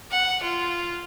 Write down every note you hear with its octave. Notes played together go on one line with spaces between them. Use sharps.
F#5
F4